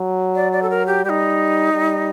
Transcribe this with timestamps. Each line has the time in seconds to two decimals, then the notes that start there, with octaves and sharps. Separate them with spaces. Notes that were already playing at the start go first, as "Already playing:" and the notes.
Already playing: F#3
0.35 D5
0.52 D5
0.62 A4
0.70 A#4
0.87 G4
1.04 G3 G4
1.09 D#4
1.73 G3